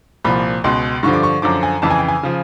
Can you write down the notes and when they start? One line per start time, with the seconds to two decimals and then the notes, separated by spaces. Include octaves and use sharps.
0.24 C2 A#2 F3 B5
0.64 C#2 B2 C6
1.03 G2 D3 F3 C#6
1.13 D6
1.23 C#6
1.42 F#2 D3 F3 D6
1.63 G#5
1.82 F2 C#3 E3 A5
1.91 G#5
1.99 G5
2.08 G#5
2.23 C#3 F3